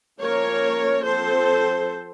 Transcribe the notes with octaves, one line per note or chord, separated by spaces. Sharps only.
F3 A#3 C#4 A#4 C#5
F3 C4 A4 C5